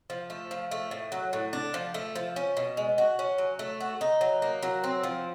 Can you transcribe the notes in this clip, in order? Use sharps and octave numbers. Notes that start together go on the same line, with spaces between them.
F3
A3
F3
A3
A2
F#3
A2
D4
F3
A3
F3
C#4
B2
G#3
F#4
C#4
F#3
A3
F#4
D#4
F#3
A#3
F#3
C4
F3